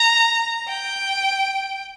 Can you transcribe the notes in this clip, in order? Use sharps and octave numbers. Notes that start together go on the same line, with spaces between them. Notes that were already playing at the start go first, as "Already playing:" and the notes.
Already playing: A#5
G5